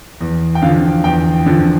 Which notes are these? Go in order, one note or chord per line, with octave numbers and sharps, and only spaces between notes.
E2
G5
D3 F3 F5
E2 G5
D3 F3